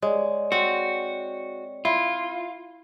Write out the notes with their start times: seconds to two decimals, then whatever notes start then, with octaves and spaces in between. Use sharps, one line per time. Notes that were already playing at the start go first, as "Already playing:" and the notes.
0.02 G#3 C#5 D5
0.52 C4 F#4
1.85 E4 F4